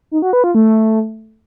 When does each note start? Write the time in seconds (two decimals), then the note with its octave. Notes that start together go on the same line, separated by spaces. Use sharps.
0.11 D#4
0.22 F#4
0.33 B4
0.44 F4
0.55 A3